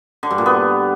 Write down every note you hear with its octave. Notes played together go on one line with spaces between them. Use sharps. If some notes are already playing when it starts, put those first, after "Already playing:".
D3
G2
A#2
B3